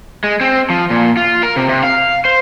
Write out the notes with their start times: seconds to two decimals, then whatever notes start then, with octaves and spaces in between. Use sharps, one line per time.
0.24 G#3
0.41 C4
0.70 F3
0.90 A#2
1.17 F4
1.43 A#4
1.56 C3
1.69 C3
1.83 F5
2.25 C5